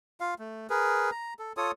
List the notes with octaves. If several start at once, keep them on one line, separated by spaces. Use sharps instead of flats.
F4 F5
A3
G#4 A#4 B4
A#5
A4
F4 A4 C#5 D#6